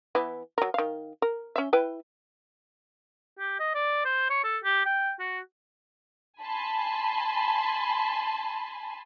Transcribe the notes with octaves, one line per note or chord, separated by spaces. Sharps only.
E3 B3 E4
F#3 A#4
D#3 F5
A#4
C#4 E5
E4 B4 G5
G4
D#5
D5
C5
C#5
A4
G4
G5
F#4
G#5 A5 B5 C6